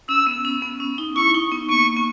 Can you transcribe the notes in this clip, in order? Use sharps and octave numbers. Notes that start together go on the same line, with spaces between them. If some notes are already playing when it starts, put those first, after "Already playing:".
C#4 E6
B3
C#4
B3
C#4
D#4
E4 C#6
D#4
B3
A#3 C#6
B3